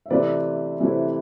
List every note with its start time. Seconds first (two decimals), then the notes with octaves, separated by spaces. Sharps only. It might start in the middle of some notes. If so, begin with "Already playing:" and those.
0.06 E5
0.10 C3 E3 A3 C4 E4 B4 D5
0.80 C3 E3 A3 C4 E4